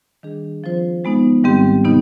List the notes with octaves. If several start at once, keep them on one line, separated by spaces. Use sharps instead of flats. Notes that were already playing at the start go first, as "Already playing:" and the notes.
D#3 G3 D4 G#4
F3 C4 F4 C5
F3 G#3 B3 D#4
G#2 D#3 G3 C4 G4
C3 D#3 B3 D#4